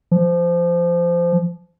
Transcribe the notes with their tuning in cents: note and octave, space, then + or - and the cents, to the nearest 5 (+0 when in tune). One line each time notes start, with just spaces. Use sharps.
F3 -20